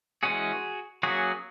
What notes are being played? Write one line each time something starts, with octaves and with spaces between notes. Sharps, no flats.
E3 G#3 C#4 F#4 G#4
F#3 A#3 C#4 F#4 G#4